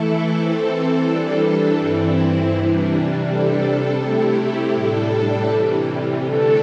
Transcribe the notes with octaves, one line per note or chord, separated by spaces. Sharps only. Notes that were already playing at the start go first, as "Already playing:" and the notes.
Already playing: E3 A3 E4 A4
E3 C4 A4
E3 G3 D4 A4
G2 E3 C4 E4
C3 E3 G3 D4
C3 G3 D4 A4
C3 A3 E4 G4
A2 G3 D4 A4
C3 E3 G3
D3 A3 D4 A4